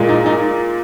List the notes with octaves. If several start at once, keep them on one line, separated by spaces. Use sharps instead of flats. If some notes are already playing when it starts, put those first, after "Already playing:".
Already playing: A#2 G#3
D#4
D#4